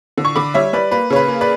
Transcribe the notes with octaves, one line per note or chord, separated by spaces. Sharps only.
D3
C#6
D3 B5 D6
G3 C#5 E5
G3 B4 D5
A#3 B4
C#3 C#5
B4
A#3
B4 D5